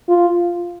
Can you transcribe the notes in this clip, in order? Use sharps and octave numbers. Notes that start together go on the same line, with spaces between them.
F4